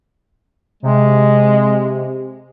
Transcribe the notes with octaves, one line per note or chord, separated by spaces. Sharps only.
C3 G#3